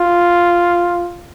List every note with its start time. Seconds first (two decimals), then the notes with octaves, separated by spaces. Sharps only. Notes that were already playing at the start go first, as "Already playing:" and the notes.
Already playing: F4